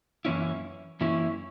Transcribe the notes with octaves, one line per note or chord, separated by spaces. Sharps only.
F#2 E3 A#3 C#4 E4
F#2 E3 A#3 C#4 E4